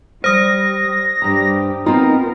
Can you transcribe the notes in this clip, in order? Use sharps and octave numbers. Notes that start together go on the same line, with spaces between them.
G3 C5 D#6 A#6
G2 G4 A#5
B3 C4 D#4 F4 A#4